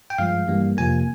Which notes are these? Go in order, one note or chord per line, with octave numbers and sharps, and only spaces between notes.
G5
G2 F3 G#3 F5
G2 E3 G3 A#3
F2 C3 F3 A#3 G#5